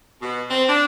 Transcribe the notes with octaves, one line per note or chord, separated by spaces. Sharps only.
B2
C4
D4